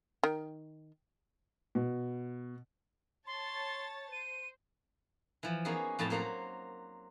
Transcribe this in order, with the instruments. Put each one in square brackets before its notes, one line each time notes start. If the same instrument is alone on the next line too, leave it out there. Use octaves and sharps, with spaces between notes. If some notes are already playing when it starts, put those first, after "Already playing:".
[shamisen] D#3
[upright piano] B2
[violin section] C#5 A5 A6 [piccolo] C6
[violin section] C5 [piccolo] D#7
[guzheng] E3 F3
A#3 B3 C#4 D#4 F#4 G#4
F2 A2 B3 A5 A#5
F#3 A#3 C5 F#5 A#5